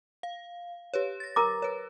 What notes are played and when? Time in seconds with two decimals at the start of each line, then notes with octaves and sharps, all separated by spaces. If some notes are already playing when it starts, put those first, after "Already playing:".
0.23 F5
0.94 G4 B4 C#5
1.20 A6 A#6
1.36 A#4 A#5 D6
1.62 B4 C#5